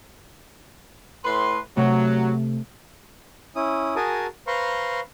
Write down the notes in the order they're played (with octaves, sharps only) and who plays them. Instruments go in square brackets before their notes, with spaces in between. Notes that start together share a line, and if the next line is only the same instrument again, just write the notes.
[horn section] A2 B4 C6
[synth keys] C3 A3 [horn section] F#3
[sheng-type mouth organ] C#4 E4 D#6
F#4 G#4 A#4 G#5 A5 D#6
B4 C5 F5 A#5 C6 C#6